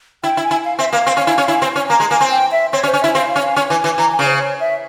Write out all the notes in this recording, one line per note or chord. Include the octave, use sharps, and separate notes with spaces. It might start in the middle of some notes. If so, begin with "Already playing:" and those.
E4 G5
E4
G#5
E4
F5
C4 E5
A#3 F5
C4
C#4
E4
C#4
E4
C4
C#4
A#3 A#5
G#3
A#3 G#5
C4
G5
E5
C4 C#5
C#4
C5
C#4
E4 E5
C4 F5
F5
C#4
F5
C#4 G#5
E3
G#5
E3
E3 A#5
G#5
C#3
C5
C#5
E5